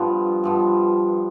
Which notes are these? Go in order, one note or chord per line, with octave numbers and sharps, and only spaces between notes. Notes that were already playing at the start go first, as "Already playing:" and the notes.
Already playing: G2 F3 B3
G2 F3 B3